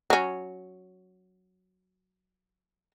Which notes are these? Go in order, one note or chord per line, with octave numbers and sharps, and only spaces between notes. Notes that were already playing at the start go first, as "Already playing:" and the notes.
F#3 C#4